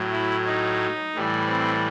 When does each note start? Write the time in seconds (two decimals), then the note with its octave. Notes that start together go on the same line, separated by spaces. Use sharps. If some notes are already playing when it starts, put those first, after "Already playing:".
Already playing: A2 F#3
0.12 E4
0.46 D#4
1.14 A2 E3 G3
1.48 C4